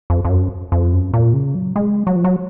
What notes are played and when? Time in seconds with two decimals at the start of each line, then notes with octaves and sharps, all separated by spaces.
0.10 F2
0.25 F2
0.30 F#2
0.72 F2
0.93 F#2
1.14 A#2
1.33 C#3
1.55 F#3
1.76 G#3
2.07 F#3
2.16 F3
2.24 F#3